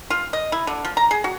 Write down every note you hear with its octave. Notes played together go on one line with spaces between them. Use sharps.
F4
D#5
E4
D3
F3
A#5
G#4
F#4